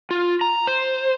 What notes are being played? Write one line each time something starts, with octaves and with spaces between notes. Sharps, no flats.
F4
A#5
C5